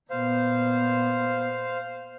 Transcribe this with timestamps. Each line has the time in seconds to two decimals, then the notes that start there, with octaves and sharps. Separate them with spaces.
0.11 A#2 B3 C5 F5